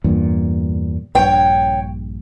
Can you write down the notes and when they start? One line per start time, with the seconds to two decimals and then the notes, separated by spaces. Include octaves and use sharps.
0.04 E2 G2 A#2
1.15 A#1 G2 C#5 G5